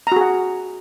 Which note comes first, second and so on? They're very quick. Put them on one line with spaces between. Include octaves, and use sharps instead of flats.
A#5 F#4 G#4 F#5